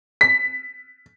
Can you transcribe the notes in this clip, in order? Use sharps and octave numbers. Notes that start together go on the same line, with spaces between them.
B6